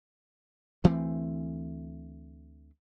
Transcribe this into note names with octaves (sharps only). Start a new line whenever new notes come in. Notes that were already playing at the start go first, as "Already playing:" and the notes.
D2 E3 A3 C4